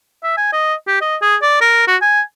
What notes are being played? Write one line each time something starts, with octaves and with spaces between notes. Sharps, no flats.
E5
G#5
D#5
G4
D#5
G#4
D5
A#4
F#4
G#5